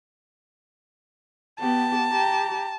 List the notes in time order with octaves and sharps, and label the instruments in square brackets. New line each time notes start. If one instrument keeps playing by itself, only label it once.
[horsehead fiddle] B3 G4 [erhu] A5
[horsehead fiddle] G4 A#5